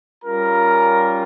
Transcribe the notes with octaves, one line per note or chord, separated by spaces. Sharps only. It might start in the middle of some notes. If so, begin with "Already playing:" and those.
G3 C#4 F4 A#4 A#5